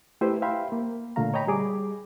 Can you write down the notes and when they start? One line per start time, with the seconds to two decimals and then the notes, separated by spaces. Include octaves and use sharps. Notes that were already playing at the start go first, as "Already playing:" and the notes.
0.21 A3 E4 G4 B4 C5 E5
0.42 E5 F5 G5 B5 C6
0.72 A#3
1.16 A#2 D3 A3 F5 A#5
1.34 C#5 D#5 G5 A#5 B5
1.47 G3 G#4 D6